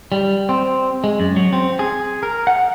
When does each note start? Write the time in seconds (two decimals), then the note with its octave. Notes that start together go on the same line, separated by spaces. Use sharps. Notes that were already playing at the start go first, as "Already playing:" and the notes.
0.12 G3
0.49 C4
1.04 G#3
1.20 F#2
1.36 F#3
1.53 C4
1.79 G#4
2.23 A#4
2.47 F#5